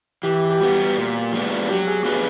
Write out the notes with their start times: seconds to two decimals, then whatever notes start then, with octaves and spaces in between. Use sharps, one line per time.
0.23 E3 G4
0.49 G4
0.60 G3 B3 F#4
0.97 A#2
1.32 F3 G#3 B3 D4
1.68 F#3 G4
1.87 G#4
2.04 B3 D4 F#4 G#4 B4